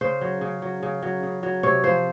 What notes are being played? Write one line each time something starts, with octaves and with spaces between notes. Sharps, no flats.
C#3 C5
F#3
C#3
F#3
C#3
F#3
C#3
F#3
C3 C#5
F3 C5